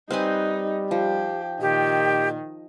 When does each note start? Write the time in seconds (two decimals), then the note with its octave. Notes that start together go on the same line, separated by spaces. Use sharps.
0.10 G3 C4 D#4 B4 G#5
0.91 F3 G4
1.61 A#2 D#3 G4